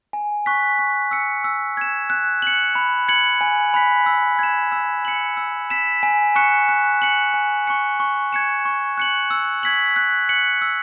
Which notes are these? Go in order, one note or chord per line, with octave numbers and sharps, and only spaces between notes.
G#5
C#6 F#6 B6
C#6
E6 C#7
E6
G#6 E7
F#6
C#7 F#7
B5
G#6 C#7 F#7
G#5
B5 F#6 B6
E6
G#6 E7
E6
C#7 F#7
E6
B6 E7
G#5
C#6 F#6 C#7 E7
F#6
C#7 F#7
G#5
C#6 F#6 C#7
C#6
G#6 C#7 E7
C#6
F#6 C#7 F#7
E6
G#6 B6 F#7
F#6
C#7 F#7
E6